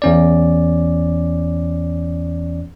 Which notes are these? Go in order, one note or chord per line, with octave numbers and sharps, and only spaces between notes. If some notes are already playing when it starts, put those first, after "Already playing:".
E2 C#4 D5